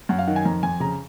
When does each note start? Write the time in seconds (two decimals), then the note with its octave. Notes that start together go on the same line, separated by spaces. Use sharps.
0.09 F#2 F#5
0.19 F5
0.27 D#3 F#5
0.36 G#5
0.45 F2 A#5
0.63 F2 G#5
0.80 C#3 A#5